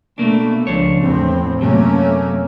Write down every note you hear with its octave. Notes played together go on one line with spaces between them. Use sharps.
B2 A3 A#3 D4
C#2 F3 D4 C#5
E2 A2 C4
F#2 C3 A3 A#3 C#4